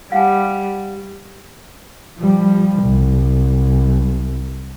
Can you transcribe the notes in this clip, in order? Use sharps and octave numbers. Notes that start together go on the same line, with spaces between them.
G3 F5 F#5 G#5
F3 G3
C2